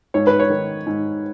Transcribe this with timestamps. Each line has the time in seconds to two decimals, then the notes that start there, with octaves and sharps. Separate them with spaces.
0.14 G#2 C#5
0.27 B4
0.40 C#5
0.50 D#3
0.87 G#2